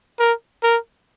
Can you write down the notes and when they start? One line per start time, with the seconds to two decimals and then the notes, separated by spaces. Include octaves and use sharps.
0.19 A#4
0.64 A#4